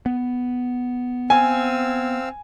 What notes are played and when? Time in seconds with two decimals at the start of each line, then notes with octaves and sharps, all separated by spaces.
0.06 B3
1.30 C4 F5 G#5 E6